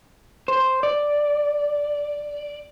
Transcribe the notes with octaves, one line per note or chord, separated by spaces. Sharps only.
C5
D5